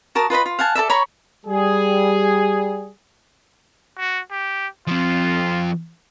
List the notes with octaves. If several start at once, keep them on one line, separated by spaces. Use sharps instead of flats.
F#4 A#4 A5 D#6
F4 B4 D#5 B5
F4
F5 F#5 G#5 A5
A4 A#4 D5 E5
C#5 A#5 B5 C#6
G3 G#4
F#4
G4
F3 C4 F4